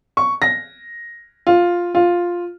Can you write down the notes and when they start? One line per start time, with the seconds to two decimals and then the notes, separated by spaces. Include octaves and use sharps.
0.17 C#6
0.42 A#6
1.47 F4
1.95 F4